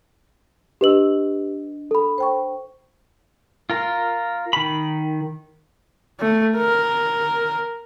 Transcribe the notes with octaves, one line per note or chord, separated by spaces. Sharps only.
D4 G4 B4 D#5 E6 F#7
A4 B5
C5 G5 C#6
F4 A#4
D#3 B5
A3
A#4